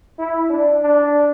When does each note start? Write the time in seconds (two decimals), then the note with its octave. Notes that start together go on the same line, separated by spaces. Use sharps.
0.19 E4
0.50 D4
0.83 D4